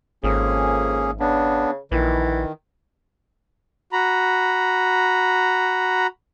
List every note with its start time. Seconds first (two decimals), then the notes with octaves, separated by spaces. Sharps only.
0.24 G#1 F2 A#3 C#4 G#4
1.20 C#3 B3 D4
1.92 A#1 D#3 E3
3.92 F#4 A#5 B5